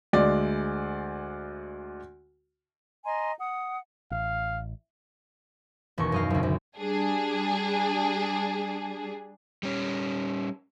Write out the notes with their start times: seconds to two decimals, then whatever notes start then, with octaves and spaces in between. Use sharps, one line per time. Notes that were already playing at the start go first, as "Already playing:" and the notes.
0.13 D2 G#3 D5
3.05 D#5 G#5 A#5 C6
3.39 F#5 D#6
4.11 A1 F5
5.98 E1 D#2 B2 C#6
6.12 F#2 D#5 F5
6.30 F#1 D2
6.43 D2
6.78 G3 D4 G#4
9.63 G3 C#4